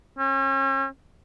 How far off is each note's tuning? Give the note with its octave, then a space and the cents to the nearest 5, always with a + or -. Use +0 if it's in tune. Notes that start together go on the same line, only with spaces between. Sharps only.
C#4 -40